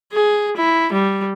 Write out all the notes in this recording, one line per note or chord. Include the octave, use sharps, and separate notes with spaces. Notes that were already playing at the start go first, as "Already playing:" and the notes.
G#4
E4
G3